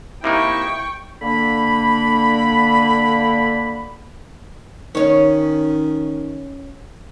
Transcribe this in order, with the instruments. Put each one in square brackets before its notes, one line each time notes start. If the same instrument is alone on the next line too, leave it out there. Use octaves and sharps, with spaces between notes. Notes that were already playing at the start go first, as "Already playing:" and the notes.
[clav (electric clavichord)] C3 A#3 D#4 [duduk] E4 [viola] G5 C#6
[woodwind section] D3 A#3 B5
[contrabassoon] D#3 [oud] C#4 C#5